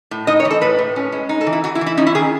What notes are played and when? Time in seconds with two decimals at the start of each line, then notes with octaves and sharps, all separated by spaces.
0.11 A2
0.27 D#4 D#5
0.40 C#5
0.45 E3
0.50 A4
0.62 A2 B4
0.79 A2
0.96 C#4
1.12 G#3
1.29 D#4
1.41 A4
1.47 E3
1.53 E4
1.64 E3 F#4
1.75 E4
1.81 E3
1.86 E4
1.97 C#4 D#4
2.07 E4
2.15 D#3 G#4